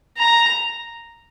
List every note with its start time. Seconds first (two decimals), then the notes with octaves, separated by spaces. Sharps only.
0.18 A#5